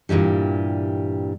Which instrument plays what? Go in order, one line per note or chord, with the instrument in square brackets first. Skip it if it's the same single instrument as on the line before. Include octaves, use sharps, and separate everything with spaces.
[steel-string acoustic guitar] G2 A#2 D#3 E3 G3